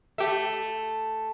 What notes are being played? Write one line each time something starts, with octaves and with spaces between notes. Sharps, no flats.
A3 G4 E5